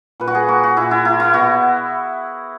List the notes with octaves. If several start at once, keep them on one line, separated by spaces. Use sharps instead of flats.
A#2 B4
F#4
G#4
A#3 F#4
F#4
A#2 E4
E4
A#3 E4
E4
B2 F#4